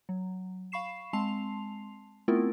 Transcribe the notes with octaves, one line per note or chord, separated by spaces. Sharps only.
F#3
F5 B5 C#6 C7 E7
G#3 C4 A5 C6 C7 F7
A3 B3 C4 E4 F4 A#4